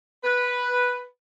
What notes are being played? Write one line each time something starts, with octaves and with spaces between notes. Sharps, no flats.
B4